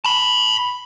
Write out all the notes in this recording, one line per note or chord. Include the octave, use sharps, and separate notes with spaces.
A5 B5